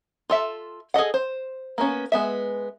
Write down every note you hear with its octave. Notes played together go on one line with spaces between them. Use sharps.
F4 A4 E5
G#4 A4 D#5 F#5
C5
A#3 B3 C#4
G#3 B3 E5